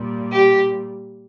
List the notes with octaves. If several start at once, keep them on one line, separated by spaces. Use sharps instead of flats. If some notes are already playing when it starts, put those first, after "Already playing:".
Already playing: A#2 G3
G4